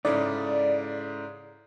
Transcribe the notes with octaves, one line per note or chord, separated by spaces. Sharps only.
G#2 C#3 D#4 E4 A4 D5